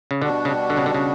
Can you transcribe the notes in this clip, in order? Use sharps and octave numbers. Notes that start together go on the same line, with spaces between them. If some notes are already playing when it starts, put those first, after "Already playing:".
C#3
B2 D3 G3 D4 F#4
C#3
D3
C#3
D3
C#3